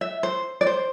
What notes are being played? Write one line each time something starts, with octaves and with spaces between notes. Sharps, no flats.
E5
C5
D5
C5